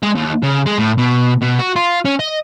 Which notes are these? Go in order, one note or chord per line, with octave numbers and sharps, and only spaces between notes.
G#3
D#2
C#3
G#3
A2
B2
B2
F#4
F4
C#4
D#5